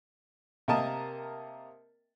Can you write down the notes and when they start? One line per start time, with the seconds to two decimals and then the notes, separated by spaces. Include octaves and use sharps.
0.68 C3 A#3 A#4 D#5 A5